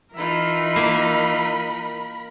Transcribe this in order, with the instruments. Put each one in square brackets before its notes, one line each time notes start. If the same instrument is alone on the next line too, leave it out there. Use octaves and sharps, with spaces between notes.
[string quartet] E3 D#4 [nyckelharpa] F4 E5 [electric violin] A#4 B5
[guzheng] A#3